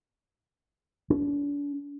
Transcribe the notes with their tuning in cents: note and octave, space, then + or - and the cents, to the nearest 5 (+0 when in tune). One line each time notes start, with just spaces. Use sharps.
D4 -40